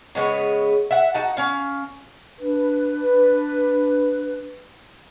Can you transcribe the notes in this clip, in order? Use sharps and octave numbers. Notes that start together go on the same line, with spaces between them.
C#3 G#3 B3 C#5
E5 F#5
D#4 F#4 F#5 A5
C#4 F5
D4 B4